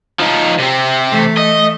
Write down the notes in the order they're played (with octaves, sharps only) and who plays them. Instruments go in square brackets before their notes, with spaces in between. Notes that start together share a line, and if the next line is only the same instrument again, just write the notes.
[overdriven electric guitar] F3 D#4
C3 C4
[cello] E3 A3
[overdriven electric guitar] D#5